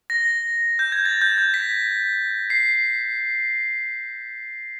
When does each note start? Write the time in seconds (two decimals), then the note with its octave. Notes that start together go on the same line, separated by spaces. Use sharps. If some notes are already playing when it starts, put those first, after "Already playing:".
0.10 A#6
0.79 G6
0.92 G#6
1.05 A6
1.21 G6
1.38 G#6
1.54 B6
2.50 C7